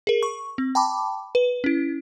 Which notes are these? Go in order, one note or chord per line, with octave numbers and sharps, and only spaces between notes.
G#4 A#4
C#6
C4
G5 A5 B5 D6
B4
C#4 E4